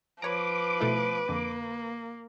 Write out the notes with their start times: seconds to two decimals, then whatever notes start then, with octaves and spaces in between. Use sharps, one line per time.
0.22 F3 B4 C#5 A#5 D6
0.80 B2 A3 E4
1.29 F2 D3 A#3